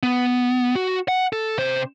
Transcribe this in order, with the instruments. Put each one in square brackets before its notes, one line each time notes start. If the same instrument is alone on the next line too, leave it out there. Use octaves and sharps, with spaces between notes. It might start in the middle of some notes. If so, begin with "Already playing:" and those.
[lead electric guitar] B3
F#4
F#5
A4
C3 C5